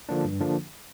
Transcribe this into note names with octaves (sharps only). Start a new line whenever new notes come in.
D3 F3 A#3 D4
G2
D3 F3 A#3 D4